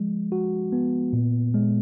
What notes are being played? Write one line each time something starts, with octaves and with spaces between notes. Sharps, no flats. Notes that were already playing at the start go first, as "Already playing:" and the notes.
Already playing: F3 G#3
F#4
B3
A#2
G#3